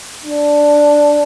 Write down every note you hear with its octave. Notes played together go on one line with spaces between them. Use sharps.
D4